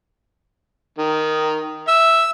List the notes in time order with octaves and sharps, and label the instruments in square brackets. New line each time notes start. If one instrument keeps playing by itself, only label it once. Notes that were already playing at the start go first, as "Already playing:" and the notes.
[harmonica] D#3
[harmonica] E5 [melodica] E6